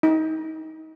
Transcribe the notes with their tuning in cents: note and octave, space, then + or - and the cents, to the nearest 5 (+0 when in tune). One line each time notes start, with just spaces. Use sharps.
D#4 +30